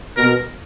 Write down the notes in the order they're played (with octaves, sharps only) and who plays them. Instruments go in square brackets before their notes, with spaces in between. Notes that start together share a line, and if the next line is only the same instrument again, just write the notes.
[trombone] B2 [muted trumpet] A#4